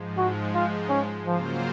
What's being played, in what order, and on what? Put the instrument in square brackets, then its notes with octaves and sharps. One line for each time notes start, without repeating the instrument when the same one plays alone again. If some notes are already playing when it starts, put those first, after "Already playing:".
Already playing: [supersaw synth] G#2 F3 G#3
[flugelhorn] F#4
F4
C#4
[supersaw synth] C#3 F#3 A#3 F4 C5 [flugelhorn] F3